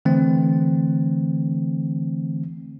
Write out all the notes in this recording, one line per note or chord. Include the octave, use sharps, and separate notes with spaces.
D3 E3 A3 C4